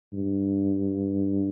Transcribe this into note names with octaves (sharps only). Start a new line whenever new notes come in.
G2